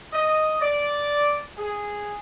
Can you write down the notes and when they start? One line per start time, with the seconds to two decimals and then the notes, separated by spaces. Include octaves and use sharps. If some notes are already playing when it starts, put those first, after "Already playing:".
0.13 D#5
0.61 D5
1.57 G#4